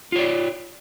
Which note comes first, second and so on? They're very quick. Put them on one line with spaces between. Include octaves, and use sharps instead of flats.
F4 C#5 D5